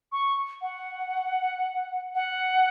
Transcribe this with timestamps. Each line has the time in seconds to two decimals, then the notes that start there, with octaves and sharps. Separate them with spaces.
0.12 C#6
0.62 F#5
2.15 F#5